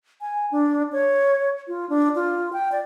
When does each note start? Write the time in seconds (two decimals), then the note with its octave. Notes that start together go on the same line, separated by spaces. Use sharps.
0.21 G#5
0.52 D4
0.92 C#5
1.68 F4
1.89 D4
2.15 F4
2.53 G5
2.72 D5